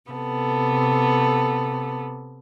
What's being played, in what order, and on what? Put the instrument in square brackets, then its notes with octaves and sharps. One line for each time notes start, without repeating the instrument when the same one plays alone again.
[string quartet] C3 B3 A4